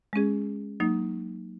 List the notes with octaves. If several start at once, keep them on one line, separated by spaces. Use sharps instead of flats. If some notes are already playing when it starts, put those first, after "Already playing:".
G#3 C#4 G#4
F#3 A#3 D#4